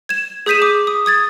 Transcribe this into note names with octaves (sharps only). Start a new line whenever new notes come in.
G#6 E7
G#4 D#6 G6 B6 D#7 E7
D6
D#6
D#6 G#6 A6